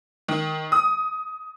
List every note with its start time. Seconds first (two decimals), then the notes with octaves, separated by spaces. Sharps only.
0.28 D#3
0.72 D#6